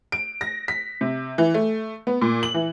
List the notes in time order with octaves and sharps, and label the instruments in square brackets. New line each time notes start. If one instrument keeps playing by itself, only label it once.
[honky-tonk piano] D7
A#6
B6
C3
E3
A3
B3
A#2
F#7
E3